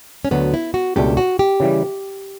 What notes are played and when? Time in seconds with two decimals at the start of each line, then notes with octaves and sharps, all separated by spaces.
0.25 C#4
0.31 D2 D3 F#3 B3
0.54 E4
0.74 F#4
0.96 C#2 B2 A3 D4 G4
1.17 F#4
1.39 G4
1.60 C#3 E3 G3